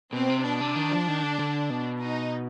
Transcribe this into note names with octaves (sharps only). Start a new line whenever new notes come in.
B2 C4
C3
B2 D4
C3
D#3
F3
D#3
D3
D3
B2
D#4